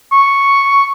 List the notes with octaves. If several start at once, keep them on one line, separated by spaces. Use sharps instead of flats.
C#6